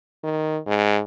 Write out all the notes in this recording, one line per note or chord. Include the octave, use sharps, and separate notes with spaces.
D#3
G#2